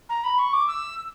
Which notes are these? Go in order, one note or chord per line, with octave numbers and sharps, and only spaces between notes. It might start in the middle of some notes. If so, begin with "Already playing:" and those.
A#5
B5
C#6
D6
E6
E6